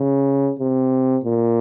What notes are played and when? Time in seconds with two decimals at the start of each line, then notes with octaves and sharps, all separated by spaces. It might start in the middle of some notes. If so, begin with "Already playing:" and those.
Already playing: C#3
0.59 C3
1.24 A#2